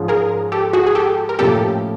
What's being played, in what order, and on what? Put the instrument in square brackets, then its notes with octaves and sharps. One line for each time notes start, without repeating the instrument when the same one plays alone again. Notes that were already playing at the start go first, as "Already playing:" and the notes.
Already playing: [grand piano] G#2 F3 G#3 C#4 F4
[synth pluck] G#4 A#4
G4 A4
F#4 G#4
G#4
G4 A4
A#4
[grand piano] A2 F3 A#3 C#4 [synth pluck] G4 A4